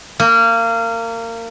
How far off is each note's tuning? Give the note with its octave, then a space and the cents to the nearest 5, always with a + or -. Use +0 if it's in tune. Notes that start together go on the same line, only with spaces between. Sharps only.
A#3 -25